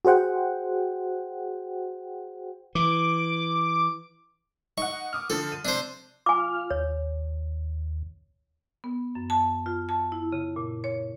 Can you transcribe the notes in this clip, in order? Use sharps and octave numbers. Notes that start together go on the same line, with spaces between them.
F#4 G#4 C5 F#5 G5
E3 D6
D#4 F#5 C#6
D6 D#6 F6
D3 F3 A4
D#7
C3 D4 C5
F4 F5 G#5 D6 F6
D#2 C#5
B3
F#2
A5
F4
A5
E4
C#3
A#2
C#5